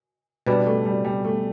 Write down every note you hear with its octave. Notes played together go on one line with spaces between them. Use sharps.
B2 G3 B3 D4
A3
G3
G3
A3